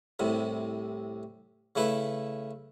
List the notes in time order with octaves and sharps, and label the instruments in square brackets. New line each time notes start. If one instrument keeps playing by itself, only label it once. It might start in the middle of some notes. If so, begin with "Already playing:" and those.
[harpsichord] C2 A2 C3
C#3 A3 E4 B4